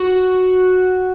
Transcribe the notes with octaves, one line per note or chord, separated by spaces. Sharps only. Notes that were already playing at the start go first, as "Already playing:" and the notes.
Already playing: F#4